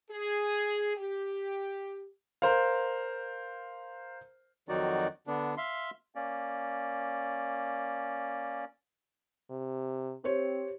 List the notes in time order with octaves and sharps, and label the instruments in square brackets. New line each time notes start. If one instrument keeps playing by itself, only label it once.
[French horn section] G#4
G4
[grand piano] A#4 C5 F5
[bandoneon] F2 D#3 F#3 D#4 F#4 D5
D3 B3 D4
E5 F5 C6
[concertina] A#3 C#4 D5
[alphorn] C3
[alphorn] C4 [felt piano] G4 C5 C#5